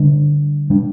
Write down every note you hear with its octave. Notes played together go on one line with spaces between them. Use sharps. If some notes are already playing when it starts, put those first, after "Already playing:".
Already playing: D3 G3 D4
G3 D4